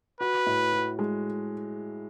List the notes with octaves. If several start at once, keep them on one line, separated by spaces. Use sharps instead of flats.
F#4 B4
A2
F#4
G#3